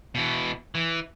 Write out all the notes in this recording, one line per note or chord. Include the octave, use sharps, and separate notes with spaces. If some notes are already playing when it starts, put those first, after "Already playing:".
B2 E3
E3